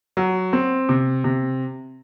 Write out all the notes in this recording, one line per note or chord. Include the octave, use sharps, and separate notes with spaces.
F#3
C4
C3
C3